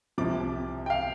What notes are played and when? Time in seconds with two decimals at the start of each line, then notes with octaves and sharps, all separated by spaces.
0.18 C2 C3 F3 D6
0.86 G5
0.90 F5